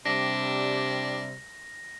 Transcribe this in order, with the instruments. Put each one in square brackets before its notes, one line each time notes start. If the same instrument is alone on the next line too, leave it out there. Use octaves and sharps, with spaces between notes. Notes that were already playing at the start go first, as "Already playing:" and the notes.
[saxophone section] C3 G3 [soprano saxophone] D4 [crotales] A#6